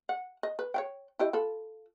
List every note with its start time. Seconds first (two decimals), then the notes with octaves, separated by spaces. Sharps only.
0.09 F#5
0.43 D#5
0.59 B4
0.74 C#5 F5 G5
1.19 E4 G4 D#5
1.33 F4 A4 B5